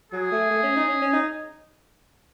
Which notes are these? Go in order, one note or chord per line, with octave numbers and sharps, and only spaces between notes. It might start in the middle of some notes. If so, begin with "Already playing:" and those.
F#3 G#4
A3
A3
C#4
D#4
C#4
C#4
D#4